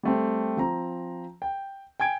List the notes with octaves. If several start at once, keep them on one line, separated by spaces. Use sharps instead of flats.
G3 A3 C4
F3 C4 A#5
G5
G5 G#5 G#6 D7